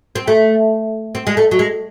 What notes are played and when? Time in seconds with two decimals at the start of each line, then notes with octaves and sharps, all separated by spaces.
0.15 C4
0.28 A3
1.15 C4
1.27 G#3
1.37 A3
1.51 F#3
1.59 G#3